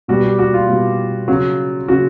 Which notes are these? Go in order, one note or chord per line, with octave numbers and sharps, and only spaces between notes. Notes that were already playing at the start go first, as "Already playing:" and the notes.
B2 G3 F#4
G4
F#4
F4
B2 G3
C#3 F#3
C#3 F#3 F#4